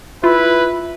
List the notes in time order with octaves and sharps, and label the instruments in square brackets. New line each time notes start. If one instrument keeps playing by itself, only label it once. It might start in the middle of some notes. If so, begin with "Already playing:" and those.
[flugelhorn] E4 [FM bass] F4 [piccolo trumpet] B4